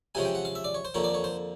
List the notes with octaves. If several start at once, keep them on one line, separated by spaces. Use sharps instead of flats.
C3 F3 G#3 C#4 G#5
G5
F#5
F5
E5
D5
C#5
C5
F2 D3 F3 A#3 C#5
D5
C#5
C5